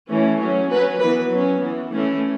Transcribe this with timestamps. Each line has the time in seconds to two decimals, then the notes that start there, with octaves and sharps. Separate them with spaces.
0.08 E3 A3 C#4
0.38 F#3 A3 C#4
0.69 F#3 C#4 B4
0.99 E3 B3 B4
1.30 F#3 C#4
1.61 E3 B3
1.91 E3 A3 C#4